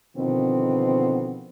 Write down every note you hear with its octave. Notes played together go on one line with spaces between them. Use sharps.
B2 D3 D#3 F3 B3 C4